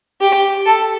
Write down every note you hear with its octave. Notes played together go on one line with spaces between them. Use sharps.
G4
A4